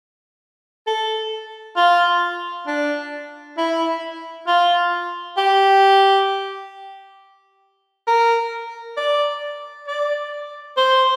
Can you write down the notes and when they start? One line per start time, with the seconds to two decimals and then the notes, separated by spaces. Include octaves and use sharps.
0.87 A4
1.76 F4
2.67 D4
3.57 E4
4.47 F4
5.37 G4
8.07 A#4
8.97 D5
9.87 D5
10.77 C5